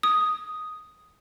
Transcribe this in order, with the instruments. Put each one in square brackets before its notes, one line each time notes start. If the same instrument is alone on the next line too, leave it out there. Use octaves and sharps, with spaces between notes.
[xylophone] D#6